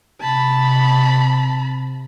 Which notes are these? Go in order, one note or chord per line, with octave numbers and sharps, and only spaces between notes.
C3 A5 B5